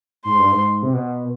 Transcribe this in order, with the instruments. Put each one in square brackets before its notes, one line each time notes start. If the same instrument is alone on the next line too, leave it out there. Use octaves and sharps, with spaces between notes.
[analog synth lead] G#2 [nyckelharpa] C6
[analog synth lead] G2
G#2
C3
B2